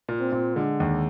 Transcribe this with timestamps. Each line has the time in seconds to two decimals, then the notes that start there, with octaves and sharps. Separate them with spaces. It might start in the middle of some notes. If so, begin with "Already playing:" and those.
0.09 A#2
0.20 C4
0.32 A#2
0.56 D3 G#3
0.80 D#2